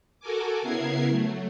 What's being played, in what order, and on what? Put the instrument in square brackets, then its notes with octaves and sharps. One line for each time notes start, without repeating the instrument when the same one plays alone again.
[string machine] F#4 A4 A#4 G#5 D6
C#3 B3 E4 A#4 G#6 C7
F#3 A3